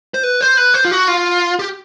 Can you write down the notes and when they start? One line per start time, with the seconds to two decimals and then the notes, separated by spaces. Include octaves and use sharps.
0.14 C5
0.23 B4
0.41 C5
0.57 B4
0.74 C5
0.85 F4
0.91 F#4
1.08 F4
1.59 G4